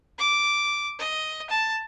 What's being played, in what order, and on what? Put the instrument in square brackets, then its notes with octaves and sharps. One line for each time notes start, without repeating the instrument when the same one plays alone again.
[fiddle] D6
D#5
A5